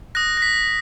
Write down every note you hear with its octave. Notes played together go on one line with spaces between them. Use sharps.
D#6 F#6 A#6
A#6
B6